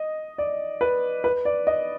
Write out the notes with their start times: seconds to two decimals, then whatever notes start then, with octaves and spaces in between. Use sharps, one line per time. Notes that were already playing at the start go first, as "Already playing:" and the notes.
Already playing: D#5
0.38 D5
0.81 B4
1.24 B4
1.45 D5
1.67 D#5